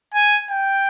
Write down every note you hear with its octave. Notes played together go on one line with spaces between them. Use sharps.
G#5
G5